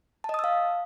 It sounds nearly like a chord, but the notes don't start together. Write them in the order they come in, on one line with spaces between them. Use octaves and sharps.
A5 D#5 D#6 E6 F5